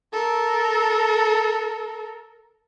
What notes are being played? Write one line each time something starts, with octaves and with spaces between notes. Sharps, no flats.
A4 A#4